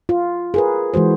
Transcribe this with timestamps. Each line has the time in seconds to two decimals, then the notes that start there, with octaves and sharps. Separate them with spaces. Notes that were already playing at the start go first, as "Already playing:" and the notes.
0.09 F4
0.54 G#4 A#4 B4
0.94 E3 G#3 F#4 C5